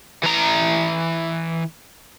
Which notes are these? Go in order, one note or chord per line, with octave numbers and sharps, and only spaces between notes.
E3 A#5